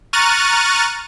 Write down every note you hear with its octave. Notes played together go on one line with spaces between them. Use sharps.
A#5 C#6 F6 F#6 A6 D#7